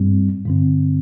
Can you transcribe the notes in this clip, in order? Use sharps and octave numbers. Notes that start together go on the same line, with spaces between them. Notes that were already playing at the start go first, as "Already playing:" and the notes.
Already playing: G2 G3 C4
G2 D3 C4